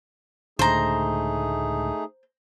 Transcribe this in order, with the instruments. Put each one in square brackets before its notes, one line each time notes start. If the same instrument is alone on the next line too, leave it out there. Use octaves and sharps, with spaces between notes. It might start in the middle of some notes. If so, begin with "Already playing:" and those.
[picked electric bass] C#2 A2 D3 [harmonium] A3 D#4 G#4 [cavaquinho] C5 A#5